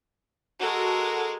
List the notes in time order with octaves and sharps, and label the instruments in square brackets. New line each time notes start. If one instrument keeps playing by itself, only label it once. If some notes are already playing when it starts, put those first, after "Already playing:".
[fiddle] G#3 A#4 [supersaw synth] F#4 A4